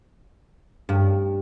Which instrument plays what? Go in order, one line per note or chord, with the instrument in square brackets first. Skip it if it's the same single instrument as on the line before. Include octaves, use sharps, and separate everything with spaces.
[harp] G2